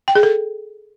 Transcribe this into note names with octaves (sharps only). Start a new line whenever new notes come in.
G5
G#4
A4